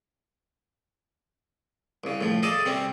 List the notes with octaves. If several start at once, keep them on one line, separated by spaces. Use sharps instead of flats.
C2 C#3
A2 F3
G#4 A4 D5 D#5 A5
C3 G3 C4 C#4